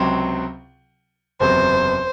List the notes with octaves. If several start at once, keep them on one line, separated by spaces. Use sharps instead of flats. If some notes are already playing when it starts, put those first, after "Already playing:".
Already playing: C#2 C3 F#3 C4
F#1 E2 C3 F#3 C5